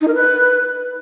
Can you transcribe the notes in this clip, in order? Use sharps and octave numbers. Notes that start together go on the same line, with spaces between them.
D#4
A#4
B4